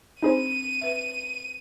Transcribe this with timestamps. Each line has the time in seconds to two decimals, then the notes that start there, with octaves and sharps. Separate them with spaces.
0.22 C4 D4 D#4 G#4 C5 D#7
0.81 B4 E5